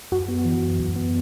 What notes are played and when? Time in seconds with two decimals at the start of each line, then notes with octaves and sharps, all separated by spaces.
0.12 F#2 F#4
0.28 B3
0.45 E3
0.63 F#2
0.80 F#2
0.96 B3